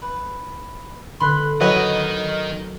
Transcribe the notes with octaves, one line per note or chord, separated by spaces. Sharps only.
B4
D3 B4 B5 C6 F#6
D#3 F#3 F#4 B4 C#5 D#5